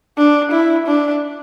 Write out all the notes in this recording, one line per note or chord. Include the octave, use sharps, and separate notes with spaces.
D4
E4
D4